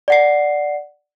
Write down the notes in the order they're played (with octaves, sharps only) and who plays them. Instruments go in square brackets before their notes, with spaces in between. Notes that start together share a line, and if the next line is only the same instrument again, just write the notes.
[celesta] D5 F#5 C7